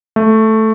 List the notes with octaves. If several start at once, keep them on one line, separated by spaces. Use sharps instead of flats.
A3